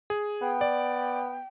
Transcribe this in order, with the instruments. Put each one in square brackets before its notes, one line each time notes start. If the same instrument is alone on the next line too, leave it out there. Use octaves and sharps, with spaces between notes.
[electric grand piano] G#4
[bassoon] B3 [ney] G5
[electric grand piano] D5